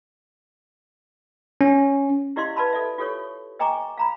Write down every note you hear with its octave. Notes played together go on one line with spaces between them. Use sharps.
C#4
E4 G4 D5 D#5 F5 C6
B4 D5 F5 A5 B5 C6
A4 D5 E5
F4 G4 A4 C#5 C#6
D#5 G5 G#5 A#5 C#6 D6
F5 A#5 B5